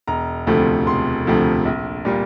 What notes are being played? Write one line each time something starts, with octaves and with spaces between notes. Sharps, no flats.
E1 A#5
D2 C3 F3 A3
E1 C6
D2 C3 F3 A3
A#1
A#2 G3 A#3